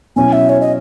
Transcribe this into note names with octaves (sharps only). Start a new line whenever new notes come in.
B2 F#3 C#4 E4 G#5
E5
C#5
D#5